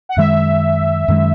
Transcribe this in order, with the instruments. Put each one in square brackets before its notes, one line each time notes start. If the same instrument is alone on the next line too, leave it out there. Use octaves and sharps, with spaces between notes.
[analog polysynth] F#5
[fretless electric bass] F#2 D#3 G#3 [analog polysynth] E5
[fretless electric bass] F#2 D#3 G#3